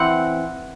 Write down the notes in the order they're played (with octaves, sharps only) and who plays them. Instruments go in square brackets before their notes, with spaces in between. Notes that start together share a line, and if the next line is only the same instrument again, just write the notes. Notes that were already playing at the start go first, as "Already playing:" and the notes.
Already playing: [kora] E3 C4 F#5